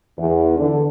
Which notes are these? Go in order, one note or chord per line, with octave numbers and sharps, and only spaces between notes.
E2
D3